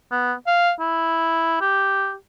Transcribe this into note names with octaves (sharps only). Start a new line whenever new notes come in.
B3
F5
E4
G4